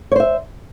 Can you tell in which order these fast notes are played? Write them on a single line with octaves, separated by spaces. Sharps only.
C#5 C5 E5